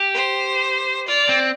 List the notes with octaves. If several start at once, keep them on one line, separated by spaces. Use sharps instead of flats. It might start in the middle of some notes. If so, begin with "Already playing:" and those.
Already playing: G4
C5
F4 D5
C4